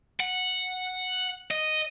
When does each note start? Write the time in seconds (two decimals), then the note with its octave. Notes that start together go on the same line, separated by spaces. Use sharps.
0.20 F#5
1.51 D#5